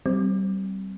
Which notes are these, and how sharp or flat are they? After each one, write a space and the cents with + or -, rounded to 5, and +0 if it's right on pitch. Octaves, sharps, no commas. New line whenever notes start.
G3 -25 C4 -5